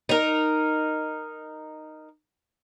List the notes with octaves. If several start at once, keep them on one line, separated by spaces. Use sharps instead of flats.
D#4 A#4